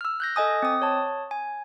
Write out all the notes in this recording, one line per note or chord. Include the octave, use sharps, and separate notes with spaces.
E6 F6
F#6 G6 A#6
A4 D#5 G#5 D#6
C4 D#6
C#5 A5
G#5